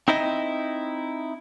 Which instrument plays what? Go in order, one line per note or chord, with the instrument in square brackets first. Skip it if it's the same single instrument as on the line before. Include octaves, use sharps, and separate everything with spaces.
[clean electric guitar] C4 D#4 E4 D#5